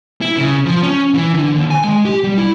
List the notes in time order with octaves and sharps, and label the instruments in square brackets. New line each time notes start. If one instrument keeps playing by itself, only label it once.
[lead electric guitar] E4
C#3
F3
C#4
E3
D3
D#2
G#5
G#3
G4
G3
E4